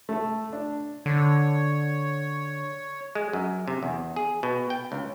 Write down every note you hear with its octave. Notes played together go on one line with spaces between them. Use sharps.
A3 A4
D4
D3 C#5
G#3
F#2
C3
E2
G#4
B2
G5
C#2